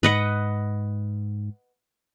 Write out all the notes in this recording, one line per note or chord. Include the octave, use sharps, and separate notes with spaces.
G#2 B4 D#5 F#5